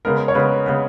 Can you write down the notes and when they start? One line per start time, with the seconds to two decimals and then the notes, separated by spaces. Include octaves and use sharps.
0.05 C#3 G#3 B3 A#4
0.28 C#5
0.35 C#3 G#3 B3 B4
0.66 C#3 G#3 B3